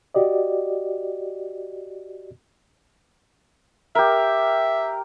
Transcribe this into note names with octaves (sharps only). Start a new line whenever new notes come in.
F#4 G4 D5 D#5
G4 A#4 E5